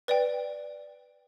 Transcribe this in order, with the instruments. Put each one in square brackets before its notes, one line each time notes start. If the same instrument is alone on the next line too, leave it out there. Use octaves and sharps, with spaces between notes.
[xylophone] B4 D5 G5